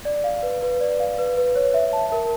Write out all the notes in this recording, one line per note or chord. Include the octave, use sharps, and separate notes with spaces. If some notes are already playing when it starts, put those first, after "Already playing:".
D5
F5
B4
B4
D5
F5
B4
B4
C#5
E5
A5
A#4